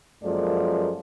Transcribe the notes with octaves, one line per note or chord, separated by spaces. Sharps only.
F#2 F3 G#3 A#3 A4 D5